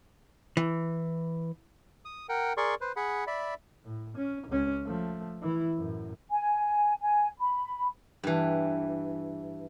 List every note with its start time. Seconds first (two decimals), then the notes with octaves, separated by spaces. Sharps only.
0.57 E3
2.05 D#6
2.29 A#4 F#5 G5
2.57 G#4 A#4 D5 C6 C#6
2.81 B4 C5
2.96 G#4 F#5 B5
3.27 D5 E5 B5
3.85 A2
4.17 C#4
4.48 C#2 C#4
4.85 F3 A3
5.42 E3 E4
5.78 F#2 A2
6.30 G#5
7.01 G#5
7.39 B5
8.23 G2 E3